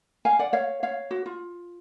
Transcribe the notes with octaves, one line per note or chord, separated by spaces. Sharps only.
F5 G#5
D5 F#5
C#5 F5
C#5 F5
F#4
F4